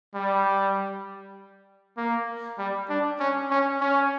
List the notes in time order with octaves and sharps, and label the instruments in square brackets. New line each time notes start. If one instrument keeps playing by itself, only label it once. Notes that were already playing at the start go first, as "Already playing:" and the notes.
[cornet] G3
A#3
G3
D4
C#4
C#4
C#4